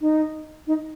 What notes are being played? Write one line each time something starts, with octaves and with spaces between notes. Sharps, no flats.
D#4
D#4